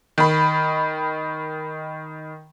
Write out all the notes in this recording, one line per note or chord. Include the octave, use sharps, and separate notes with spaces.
D#3 B5